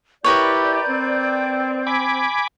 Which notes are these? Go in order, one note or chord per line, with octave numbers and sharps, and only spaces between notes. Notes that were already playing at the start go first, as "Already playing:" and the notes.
E4 G4 A#4 B4 C#5 D5 G6
C4
G#5 B5 D6